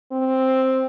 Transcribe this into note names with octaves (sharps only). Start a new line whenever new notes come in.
C4